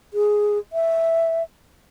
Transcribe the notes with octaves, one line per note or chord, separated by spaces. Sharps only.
G#4
E5